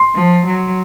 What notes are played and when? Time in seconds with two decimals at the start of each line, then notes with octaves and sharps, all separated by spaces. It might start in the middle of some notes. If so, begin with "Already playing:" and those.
Already playing: C6
0.15 F3
0.46 F#3